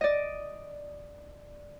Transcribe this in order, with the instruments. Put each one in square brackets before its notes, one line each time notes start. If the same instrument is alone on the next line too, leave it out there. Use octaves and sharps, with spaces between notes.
[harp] D5 D#5